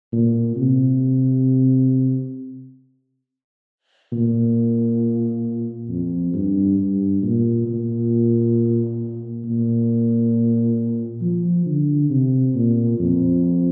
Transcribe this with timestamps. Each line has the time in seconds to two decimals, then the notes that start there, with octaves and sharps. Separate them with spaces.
0.13 A#2
0.56 C3
4.12 A#2
5.89 F2
6.34 G2
6.78 G2
7.22 A#2
7.67 A#2
9.45 A#2
11.22 F3
11.66 D3
12.10 C3
12.55 A#2
12.99 F2